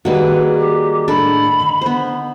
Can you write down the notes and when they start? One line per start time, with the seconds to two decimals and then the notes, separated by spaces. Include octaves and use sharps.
0.05 D#3 G3 A#3 F#4 G#4 B4 D5
0.58 G4
1.08 A2 D4 A4 B5
1.61 D3
1.81 B3 C5